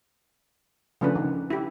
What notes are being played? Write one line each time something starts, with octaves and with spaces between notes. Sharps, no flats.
C#3 F3 A3 C#4 D4 B4
D#3
E4 G4